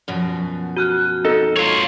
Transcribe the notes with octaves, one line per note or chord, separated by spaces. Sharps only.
F#2 B2 F3
F#4 F6 F#6
D#4 A4 D#5
F4 C#5